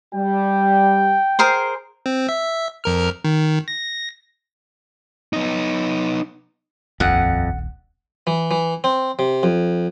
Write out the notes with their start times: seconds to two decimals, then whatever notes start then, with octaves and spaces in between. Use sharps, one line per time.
0.15 G3 G5
1.39 G#4 A#4 C5
2.06 C4
2.29 E5
2.84 F2 A#4 F6
3.24 D#3
3.68 A#6
5.33 B3 D#4
7.00 D#1 A#1 F2 F#5
8.27 E3
8.51 E3
8.84 C4
9.19 C3
9.43 F2